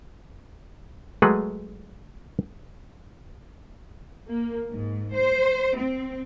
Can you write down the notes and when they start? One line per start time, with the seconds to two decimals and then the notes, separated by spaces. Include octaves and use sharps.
1.22 F#3 G#3 A3 G#4 B4 F#5
4.28 A#3
4.71 G#2
5.14 C5
5.77 C4